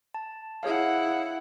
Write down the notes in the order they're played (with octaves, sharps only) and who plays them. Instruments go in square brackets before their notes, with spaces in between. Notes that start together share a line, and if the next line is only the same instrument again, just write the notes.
[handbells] A5
[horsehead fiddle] E4 F#5 [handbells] G#4 C#5 F5